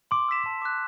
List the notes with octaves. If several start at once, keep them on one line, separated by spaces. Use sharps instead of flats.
C6 D6
E6 B6 E7
A5
D6 F#6